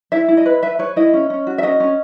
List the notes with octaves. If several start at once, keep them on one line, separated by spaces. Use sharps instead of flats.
E4 E5
E4
D#5
B4
B4 E5
B4 C#5
E4 D#5
C#4
C#4
F#4
E5
C#4 D#5
C#4